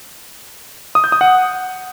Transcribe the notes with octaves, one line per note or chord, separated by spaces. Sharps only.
D#6
G6
D#6
F#5